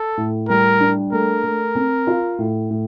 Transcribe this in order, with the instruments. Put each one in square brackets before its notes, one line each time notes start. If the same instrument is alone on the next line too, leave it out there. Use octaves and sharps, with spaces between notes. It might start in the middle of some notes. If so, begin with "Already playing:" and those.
Already playing: [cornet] A4
[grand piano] A2
[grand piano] G3 [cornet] A#4
[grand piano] D4
[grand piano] A3 [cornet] A#4
[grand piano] A3
C4
F4
A2
A2